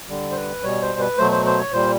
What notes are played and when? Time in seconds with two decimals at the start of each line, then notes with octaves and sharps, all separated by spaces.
0.09 D3 G3
0.32 C5
0.37 B4
0.63 B2 G3 C#5
0.82 C5
1.00 B4
1.18 B2 F#3 A3 C5
1.32 C5
1.45 C5
1.58 C#5
1.72 A#2 G3 C5